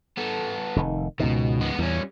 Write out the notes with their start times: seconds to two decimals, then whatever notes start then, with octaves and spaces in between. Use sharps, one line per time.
0.18 B3 A4
0.76 F1 D#3
1.20 C#2 G#2 B2 D#3
1.61 G#3 B3
1.78 E2 G3 C#4